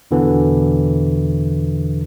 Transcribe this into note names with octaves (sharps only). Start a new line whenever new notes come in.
E2 B2 D3 E3